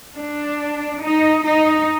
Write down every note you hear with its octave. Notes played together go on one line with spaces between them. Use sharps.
D4
D#4
D#4